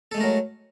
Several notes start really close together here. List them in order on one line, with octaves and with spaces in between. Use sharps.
A4 G#3 A3 A#4 F#3